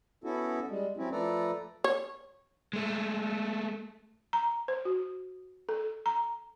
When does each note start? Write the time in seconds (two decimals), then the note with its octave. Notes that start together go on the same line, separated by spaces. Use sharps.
0.24 B3 C#4 E4 F#4 A4
0.69 G3 G#3
0.97 F#3 C4 C#4 E4
1.12 F3 A3 A4 B4 D5 A#5
1.84 C#5
2.73 G#3 A3
4.33 A#5
4.68 C5
4.85 F#4
5.69 A4
6.06 A#5